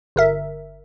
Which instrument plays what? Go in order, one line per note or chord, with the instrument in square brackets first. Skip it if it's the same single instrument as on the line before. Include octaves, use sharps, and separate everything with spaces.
[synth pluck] G1 A#4 E5